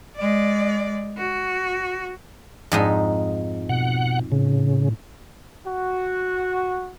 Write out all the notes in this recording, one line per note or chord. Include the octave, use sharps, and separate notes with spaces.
G#3 D5
F#4
F2 G#2 D#4
B2 F#5
A2 C#3
F#4